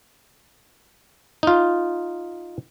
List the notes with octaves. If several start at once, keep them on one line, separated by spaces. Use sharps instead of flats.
D#4 F4